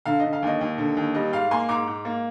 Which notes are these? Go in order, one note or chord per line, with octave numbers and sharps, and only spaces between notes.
D3 F5
D3 D#5
F5
D#2 D#5
D#2
D3
D#2
G3 D#5
G#2 F5
A#3 G#5 C6
G#2 A#5 D6
G#2
A#3